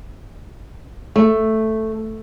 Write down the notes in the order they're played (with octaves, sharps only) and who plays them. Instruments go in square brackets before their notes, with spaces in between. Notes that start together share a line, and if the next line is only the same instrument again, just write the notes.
[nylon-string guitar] A3